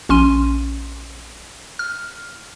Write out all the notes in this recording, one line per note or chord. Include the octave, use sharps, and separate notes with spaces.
A#1 C#4 C6 D#7
F6